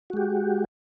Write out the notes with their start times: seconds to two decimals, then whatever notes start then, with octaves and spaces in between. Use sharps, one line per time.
0.10 F#4
0.13 G#3
0.17 G4